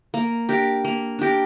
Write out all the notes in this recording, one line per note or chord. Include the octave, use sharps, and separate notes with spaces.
A#3
D4 G4 A#4
A#3
D4 G4 A#4